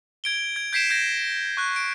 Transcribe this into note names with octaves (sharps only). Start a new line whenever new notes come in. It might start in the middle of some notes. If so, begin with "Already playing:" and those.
G#6 D7 G7
G#6
G6 G#6 B6 C7 D7 E7
G6 G#6 A#6
C#6 F#6
D7